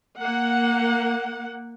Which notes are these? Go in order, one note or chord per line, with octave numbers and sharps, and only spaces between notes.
A#3 F#5